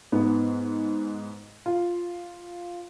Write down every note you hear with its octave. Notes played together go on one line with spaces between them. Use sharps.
G#2 B3
F4